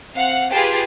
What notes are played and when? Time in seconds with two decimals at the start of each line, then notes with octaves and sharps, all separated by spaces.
0.13 C4 F5 F#5
0.51 F4 G4 G#4 B4 A5 C7